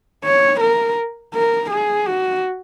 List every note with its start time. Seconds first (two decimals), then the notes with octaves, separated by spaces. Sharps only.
0.24 C#5
0.61 A#4
1.34 A#4
1.71 G#4
2.07 F#4